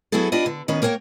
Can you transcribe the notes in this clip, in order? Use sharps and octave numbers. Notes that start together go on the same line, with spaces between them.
F#3 B3 E4 F#4 G#4 A4
D4 F4 G4 B4 D#5
D3
D#3 B3 C#4 B4
A#3 A#4 C#5 F#5 G5